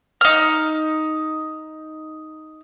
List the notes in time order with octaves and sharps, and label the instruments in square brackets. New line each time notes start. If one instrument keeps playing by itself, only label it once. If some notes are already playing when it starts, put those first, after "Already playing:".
[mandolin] D#4 F6